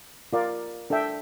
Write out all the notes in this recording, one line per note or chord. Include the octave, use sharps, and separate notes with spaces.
F4 A#4 D5 F5
D4 A4 E5 G5